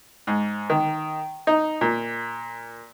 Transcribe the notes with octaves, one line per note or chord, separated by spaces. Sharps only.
G#2
D#3
D#4
A#2